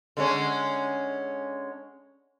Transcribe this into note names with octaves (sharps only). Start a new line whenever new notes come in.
D3 G#3 C#4